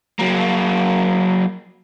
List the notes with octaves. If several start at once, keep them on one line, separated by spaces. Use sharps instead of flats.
F#3 A#3